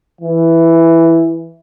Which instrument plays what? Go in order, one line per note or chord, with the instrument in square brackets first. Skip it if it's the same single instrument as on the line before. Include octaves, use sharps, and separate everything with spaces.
[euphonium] E3